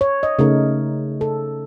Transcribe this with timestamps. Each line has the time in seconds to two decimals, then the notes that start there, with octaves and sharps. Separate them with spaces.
0.01 C#5
0.23 D#5
0.39 C#3 A3 D#4 A#4
1.21 A4